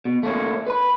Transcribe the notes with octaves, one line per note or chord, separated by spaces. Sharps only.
B2
A3 A#3 C#4 C#5
B4 B5